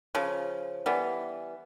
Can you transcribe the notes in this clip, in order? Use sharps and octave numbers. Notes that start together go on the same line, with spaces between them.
C#3 F3
E3 G3 B3